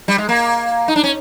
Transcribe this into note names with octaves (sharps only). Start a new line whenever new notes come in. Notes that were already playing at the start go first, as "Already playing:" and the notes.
G3
G#3
A#3
D#4
D4
C#4